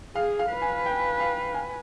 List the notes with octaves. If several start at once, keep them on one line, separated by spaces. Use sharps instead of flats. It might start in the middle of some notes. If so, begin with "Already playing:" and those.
G#4 F5
F5
B4
G#5
G5
F5
G#5